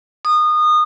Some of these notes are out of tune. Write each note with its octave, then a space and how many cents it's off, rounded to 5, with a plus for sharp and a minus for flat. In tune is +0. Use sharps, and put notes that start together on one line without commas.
D#6 -25